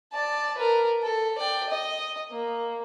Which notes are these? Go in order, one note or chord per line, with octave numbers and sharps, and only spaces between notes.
D5 A5
A#4 B4
A4
D5 G5
D#5
A#3